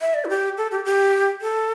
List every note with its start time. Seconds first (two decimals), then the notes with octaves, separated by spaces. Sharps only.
0.01 E5
0.14 D5
0.25 E4
0.30 G4
0.58 A4
0.71 G4
0.85 G4
1.42 A4